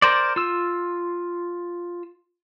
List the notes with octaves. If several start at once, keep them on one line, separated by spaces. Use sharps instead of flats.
A#4 C5 D5
F4 E6